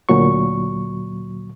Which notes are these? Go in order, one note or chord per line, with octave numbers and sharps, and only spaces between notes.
D2 A#2 F#3 C#6